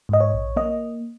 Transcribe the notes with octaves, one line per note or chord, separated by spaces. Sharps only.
G#2 D#5
C#5
A#1
A#3 D#5